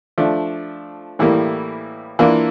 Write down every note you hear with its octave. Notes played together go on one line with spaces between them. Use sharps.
F3 A3 D4
A2 E3 G3 A#3
E3 A#3 D4 F4